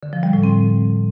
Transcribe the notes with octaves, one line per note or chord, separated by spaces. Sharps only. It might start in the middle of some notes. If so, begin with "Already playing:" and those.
D3
F3
G3
A2
C4